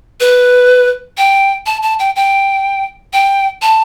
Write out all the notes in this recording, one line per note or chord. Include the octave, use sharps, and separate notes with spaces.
B4
G5
A5
A5
G5
G5
G5
A5